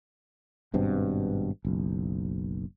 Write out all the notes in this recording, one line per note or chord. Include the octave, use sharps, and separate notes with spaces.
G#1 G2 B2 C4
F#1 B1